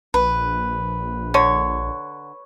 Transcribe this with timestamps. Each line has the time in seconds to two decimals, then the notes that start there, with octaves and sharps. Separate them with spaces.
0.14 A#1 B4
1.34 D3 C#5